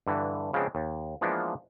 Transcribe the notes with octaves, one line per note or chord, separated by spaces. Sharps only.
G2 D3 E3
C#3 F3 G#3 B3 C4 D4
D#2
E3 F3 G#3 A#3 B3 D4